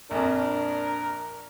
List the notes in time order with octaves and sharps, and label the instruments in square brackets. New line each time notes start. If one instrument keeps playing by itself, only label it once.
[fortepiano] A#1 F2 [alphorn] D4 [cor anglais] A#4